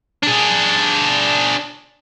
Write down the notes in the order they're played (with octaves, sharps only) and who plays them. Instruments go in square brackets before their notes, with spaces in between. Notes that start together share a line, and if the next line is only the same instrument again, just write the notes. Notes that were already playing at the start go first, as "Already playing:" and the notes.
[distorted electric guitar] D4 G#4